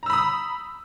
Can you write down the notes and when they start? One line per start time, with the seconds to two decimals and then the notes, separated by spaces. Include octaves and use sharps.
0.03 A#5
0.06 E6
0.10 B5
0.13 D#6